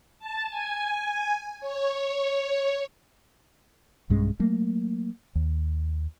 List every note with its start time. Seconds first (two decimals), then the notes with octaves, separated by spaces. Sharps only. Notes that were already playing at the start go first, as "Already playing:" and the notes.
0.19 A5
0.50 G#5
1.60 C#5
4.10 B1 G2 G#3 C#4
4.39 F#3 A3 A#3
5.35 D#2